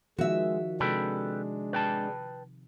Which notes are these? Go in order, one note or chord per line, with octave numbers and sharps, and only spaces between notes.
D#3 F3 G#3 F#4 E5
C3 G#3 D4 A4 B4 G5
B4 G5 A5